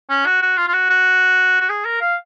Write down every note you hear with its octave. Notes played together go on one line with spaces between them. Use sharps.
C#4
F#4
F#4
F4
F4
F#4
F#4
F#4
G#4
A#4
F5